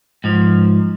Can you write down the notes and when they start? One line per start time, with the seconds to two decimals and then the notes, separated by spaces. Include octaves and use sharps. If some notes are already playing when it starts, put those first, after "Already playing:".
0.24 G#2 F3